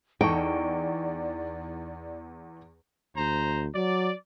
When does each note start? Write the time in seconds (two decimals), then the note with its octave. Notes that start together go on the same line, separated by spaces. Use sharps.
0.21 E2 D#4 A4 D5 G5 C#6
3.16 D2 C5 A#5
3.75 F#3 D5